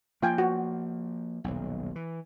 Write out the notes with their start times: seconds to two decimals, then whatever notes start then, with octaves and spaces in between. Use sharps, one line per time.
0.22 F3 A#3 F4 G5 G#5
0.38 F#4
1.44 D#1 B1
1.96 E3